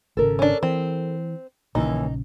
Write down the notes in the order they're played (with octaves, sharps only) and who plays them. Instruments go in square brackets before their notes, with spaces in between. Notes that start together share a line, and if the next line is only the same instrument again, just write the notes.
[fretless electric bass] G#1 C#3 [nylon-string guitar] A4 A#4
[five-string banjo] C#4 D4
[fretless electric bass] E3 [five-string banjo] C4
[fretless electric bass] A#1 C#3 [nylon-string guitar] D#2 E3 [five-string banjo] D#4